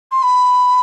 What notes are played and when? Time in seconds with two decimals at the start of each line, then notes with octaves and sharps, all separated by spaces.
0.11 C6
0.22 B5